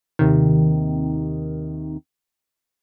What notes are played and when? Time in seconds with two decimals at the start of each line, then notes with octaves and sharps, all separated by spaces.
0.19 D#2 C3 D#3